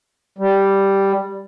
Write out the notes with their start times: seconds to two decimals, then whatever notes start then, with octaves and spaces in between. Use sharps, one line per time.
0.38 G3